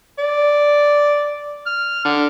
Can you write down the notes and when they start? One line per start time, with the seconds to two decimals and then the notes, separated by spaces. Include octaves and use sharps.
0.19 D5
1.66 F6
2.05 D3